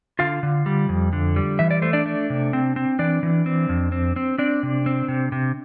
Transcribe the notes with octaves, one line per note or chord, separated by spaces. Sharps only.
D3 F4 F5
D3
G3
F2
D3
G3
E3 E5
D5
A3 C5
D4 D5
A3
C3
C4
C4
E3 D4 D5
E3
C4
F2
C4
C4
C4 D4 D5
C3
C4
C3
C3